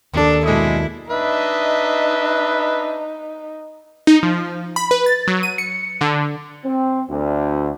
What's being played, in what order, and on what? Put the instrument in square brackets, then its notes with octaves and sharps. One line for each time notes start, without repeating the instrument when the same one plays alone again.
[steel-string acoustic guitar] D#2 A4 [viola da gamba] D4
[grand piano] B1 G#3 D#6 [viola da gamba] E4
[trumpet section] D4 D#5 E5 [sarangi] D#4 [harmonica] B4
[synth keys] D#4
F3
B5
B4
A6
F#3
D#7
C#7
D3
[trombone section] C4
D2